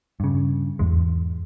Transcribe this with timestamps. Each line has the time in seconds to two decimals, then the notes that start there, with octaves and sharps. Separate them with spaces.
0.20 G2 C#3
0.79 E2 G#2 G#3